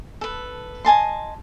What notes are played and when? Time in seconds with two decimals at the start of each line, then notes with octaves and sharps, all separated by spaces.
0.21 A4 B4
0.85 D#5 G#5 A5 C6